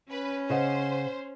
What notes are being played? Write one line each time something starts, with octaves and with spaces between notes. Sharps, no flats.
C#4 B4
C#3 C5 D#5 F#5